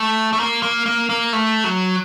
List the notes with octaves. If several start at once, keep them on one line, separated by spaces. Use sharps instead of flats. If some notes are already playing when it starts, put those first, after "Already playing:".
Already playing: A3
A3
A#3
A#3
A#3
A#3
A3
F#3